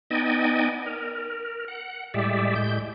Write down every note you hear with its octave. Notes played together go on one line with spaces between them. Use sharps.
B3 D#4 D5 D#5 G5 G#5
A#4
F#5
A2 G3 G#3 G4 D5 E5
A2 G#3 G6